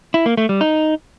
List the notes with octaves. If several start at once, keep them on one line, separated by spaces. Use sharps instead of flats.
E4
A#3
A3
G3
D#4